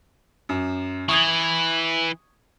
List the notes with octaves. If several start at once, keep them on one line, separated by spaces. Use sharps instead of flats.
F#2
E3 C#6 D#6 G#6